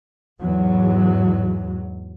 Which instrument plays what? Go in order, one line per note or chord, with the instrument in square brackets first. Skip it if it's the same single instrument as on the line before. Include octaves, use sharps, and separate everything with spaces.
[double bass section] E2 G#2 F#3